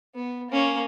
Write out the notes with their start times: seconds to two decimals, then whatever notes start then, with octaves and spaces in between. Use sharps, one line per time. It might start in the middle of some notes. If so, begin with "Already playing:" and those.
0.15 B3
0.50 A#3 C#4